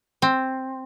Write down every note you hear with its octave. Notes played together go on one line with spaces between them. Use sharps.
C4